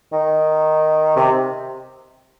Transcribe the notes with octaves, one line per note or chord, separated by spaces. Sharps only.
D#3
C3